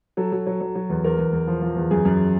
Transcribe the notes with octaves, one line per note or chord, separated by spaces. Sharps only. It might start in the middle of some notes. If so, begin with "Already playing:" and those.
F#3 A4
F#3
F#3
F#3
F#3
E2
E2 A#4
E2
E2
F3
F3
E2
F#2 G#4
F#2